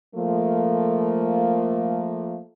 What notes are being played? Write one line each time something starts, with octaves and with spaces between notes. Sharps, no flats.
F3 A3 A#3